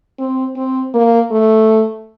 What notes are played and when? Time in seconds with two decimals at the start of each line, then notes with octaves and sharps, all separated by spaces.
0.19 C4
0.56 C4
0.94 A#3
1.31 A3